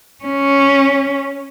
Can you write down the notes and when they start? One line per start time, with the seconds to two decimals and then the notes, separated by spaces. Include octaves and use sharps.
0.25 C#4